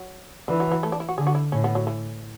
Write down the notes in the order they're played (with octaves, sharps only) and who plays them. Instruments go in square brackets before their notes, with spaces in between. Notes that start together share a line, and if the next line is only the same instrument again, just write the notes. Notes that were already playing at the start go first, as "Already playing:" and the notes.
Already playing: [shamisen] F#3
[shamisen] D3 [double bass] E3
[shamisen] F#3
F#3
A3
D4
E4
F#4
[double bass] D3 [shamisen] G#4
[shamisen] F#4
E4
[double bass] A2 [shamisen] C#4
[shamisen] B3
F#3
E3